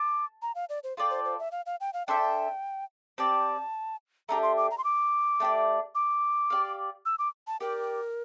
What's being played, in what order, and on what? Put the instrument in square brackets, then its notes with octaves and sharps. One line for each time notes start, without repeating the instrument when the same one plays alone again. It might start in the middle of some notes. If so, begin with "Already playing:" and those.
Already playing: [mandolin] A5 [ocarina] D6
[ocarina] A#5
F5
D5
C5
[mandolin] F4 A4 D5 G5
[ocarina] C5
C5
E5
F5
F5
G5
F5
[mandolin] D4 A4 C5 E5 [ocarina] G5
[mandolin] C4 G4 D5 [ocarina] A5
[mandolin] A3 D4 G4 [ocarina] A#5
[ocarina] C6
D6
A#5
C6
D6
[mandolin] A3 D4 G4 D5
[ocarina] D6
[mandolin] G4 D5 F5
[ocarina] E6
D6
A5
[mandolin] G4 D5 G5 [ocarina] A#4